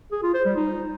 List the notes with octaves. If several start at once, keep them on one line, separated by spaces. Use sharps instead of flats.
G#4
F4
C5
G3
D#4